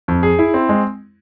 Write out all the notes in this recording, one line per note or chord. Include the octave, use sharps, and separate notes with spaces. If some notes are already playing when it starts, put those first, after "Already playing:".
F2
G#4
E4
C4
G#3